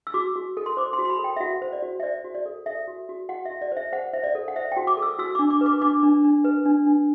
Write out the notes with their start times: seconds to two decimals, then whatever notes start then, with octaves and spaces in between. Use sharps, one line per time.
0.07 E6
0.14 F#4 D6
0.36 F#4
0.57 A4
0.66 C6
0.77 C5 D6
0.93 C6
0.99 F#4
1.05 C6
1.10 B5
1.19 A4
1.24 G5
1.36 E5
1.40 F#4 F#5
1.62 C5
1.72 D5
1.82 F#4
2.00 E5
2.03 C5 D5
2.24 F#4
2.34 D5
2.46 A4
2.66 A4 E5
2.88 F#4
3.09 F#4
3.29 F#4 F#5
3.45 E5
3.51 F#4
3.62 D5
3.72 C5 E5
3.92 C5 F#5
4.13 C5 E5
4.24 D5
4.35 A4
4.48 F#5
4.56 C5 E5
4.72 G5
4.77 F#4
4.87 D6
4.97 A4
5.02 E6
5.19 F#4 E6
5.35 D6
5.39 D4
5.50 D6
5.61 B4
5.66 D6
5.81 D4 D6
6.03 D4
6.24 D4
6.44 B4
6.65 D4
6.86 D4